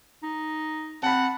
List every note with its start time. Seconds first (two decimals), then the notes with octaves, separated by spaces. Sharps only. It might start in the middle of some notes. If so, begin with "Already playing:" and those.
0.23 D#4
1.03 C4 F#5 A5 B5